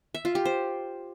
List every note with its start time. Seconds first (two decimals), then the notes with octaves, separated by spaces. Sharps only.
0.14 E5
0.25 F4
0.35 G4
0.45 C5